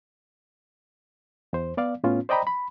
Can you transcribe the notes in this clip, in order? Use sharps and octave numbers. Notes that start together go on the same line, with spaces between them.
E2 C5
B3 D5 F5
A2 B3 C#4 F4
C5 D5 D#5 G5 A#5 B5
B5